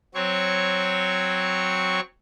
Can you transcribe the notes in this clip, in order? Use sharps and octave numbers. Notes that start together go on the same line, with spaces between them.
F#3 C4 C#5 C#6